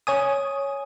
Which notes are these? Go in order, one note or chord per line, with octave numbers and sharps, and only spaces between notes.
C#5 G#5 D#6